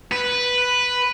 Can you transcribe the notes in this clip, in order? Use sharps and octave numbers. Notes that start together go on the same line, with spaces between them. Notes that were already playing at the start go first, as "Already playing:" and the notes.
B4